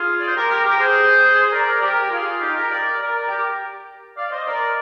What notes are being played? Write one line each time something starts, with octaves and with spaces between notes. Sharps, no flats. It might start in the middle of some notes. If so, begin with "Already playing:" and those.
Already playing: F4 G#4
D5
C5
G4 A#4
G4 A#4
G4 A#4
G#4 C5
C5
A#4 D5
G4 A#4
F4 G#4
D#4 G4
G4 A#4
A#4 D5
A#4 D5
G4 A#4
D5 F5
C5 D#5
A#4 D5